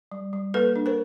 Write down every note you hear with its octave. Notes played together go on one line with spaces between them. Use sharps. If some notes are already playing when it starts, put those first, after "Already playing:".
G3
G3
A#3 A4 B4
D4
A#4 C5